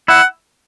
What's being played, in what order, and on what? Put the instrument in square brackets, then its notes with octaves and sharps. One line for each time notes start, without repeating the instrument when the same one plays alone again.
[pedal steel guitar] E4 E5 [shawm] F#5